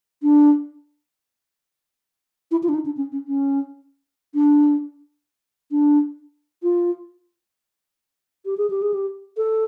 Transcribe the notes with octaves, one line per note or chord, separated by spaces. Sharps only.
D4
E4
F4
D4
D#4
D4
C#4
C#4
C#4
D4
D4
F4
G4
G#4
G4
G#4
G4
A4